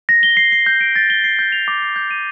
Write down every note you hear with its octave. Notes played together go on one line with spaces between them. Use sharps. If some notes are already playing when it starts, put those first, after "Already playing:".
A#6
G7
C7
C7
G6
D7
A6
G7
C7
G6
F7
D6
C7
G6
D#7